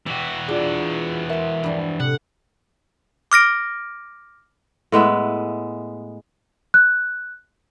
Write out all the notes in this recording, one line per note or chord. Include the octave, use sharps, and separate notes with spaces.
E3 F#4 G4
D4 F4 G#4
A#4 E5 A5 C6
G2 F3
A2 C3 F#5
D6 F6 A#6 D7
A2 G#3 B3 E5
F#6